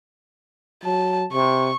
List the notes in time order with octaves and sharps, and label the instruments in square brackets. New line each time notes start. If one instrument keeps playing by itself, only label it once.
[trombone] F#3 [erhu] A5
[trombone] C3 [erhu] C#6